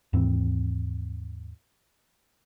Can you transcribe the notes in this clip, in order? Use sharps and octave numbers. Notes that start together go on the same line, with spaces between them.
D#2 G#2 E3 C4